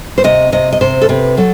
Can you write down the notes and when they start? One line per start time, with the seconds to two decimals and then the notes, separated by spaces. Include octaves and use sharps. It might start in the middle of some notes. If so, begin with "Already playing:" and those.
0.18 C5
0.24 C3 D#5
0.52 C3 D#5
0.73 D#5
0.81 C3 C5
1.02 A4
1.09 C3 B4
1.37 F#3 A4